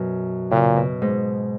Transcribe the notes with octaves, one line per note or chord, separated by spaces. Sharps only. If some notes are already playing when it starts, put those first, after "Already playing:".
Already playing: F#2 B2
A#2 C#3
B2
G#2